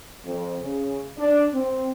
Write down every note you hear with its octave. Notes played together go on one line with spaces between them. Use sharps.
F2
C#3
D4
C4